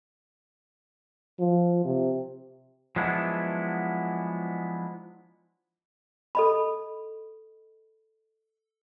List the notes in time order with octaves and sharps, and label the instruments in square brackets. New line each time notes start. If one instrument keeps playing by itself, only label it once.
[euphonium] F3
C3
[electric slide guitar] F3 F#3 G#3 B3 D4 E4
[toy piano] A4 D#5 B5